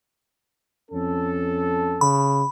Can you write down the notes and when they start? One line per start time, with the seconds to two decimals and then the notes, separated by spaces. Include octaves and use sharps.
0.91 F2 C#4 A4
2.01 C#3 B5